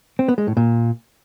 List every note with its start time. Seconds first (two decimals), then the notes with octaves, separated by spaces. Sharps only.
0.19 C4
0.28 B3
0.38 G#3
0.47 A2
0.57 A#2